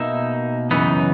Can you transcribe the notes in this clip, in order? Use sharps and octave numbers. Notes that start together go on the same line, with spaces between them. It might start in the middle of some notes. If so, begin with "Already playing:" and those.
Already playing: B2 A#3 D#4 E5
F#2 C#3 E3 B3 D#4